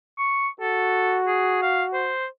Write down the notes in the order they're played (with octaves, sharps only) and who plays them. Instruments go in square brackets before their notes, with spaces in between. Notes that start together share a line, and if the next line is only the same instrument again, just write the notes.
[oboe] C#6
[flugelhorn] F#4 [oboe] A4
[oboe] G#4
F5
C5